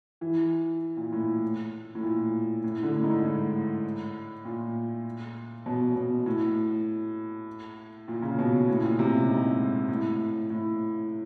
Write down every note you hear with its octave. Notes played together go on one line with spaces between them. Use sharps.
E3
A#2
A2
A2
A#2
A2
D3
A2
G#2
A2
A#2
B2
B2
A2
A#2
C#3
B2
A2
A#2
C3
G#2
A2
A2